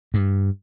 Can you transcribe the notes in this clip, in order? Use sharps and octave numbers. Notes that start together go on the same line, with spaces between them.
G2